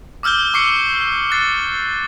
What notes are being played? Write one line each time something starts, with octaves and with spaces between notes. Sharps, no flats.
D6 E6 F6 G6 G7
C#6 D6 C7 C#7
F#6 A6 C7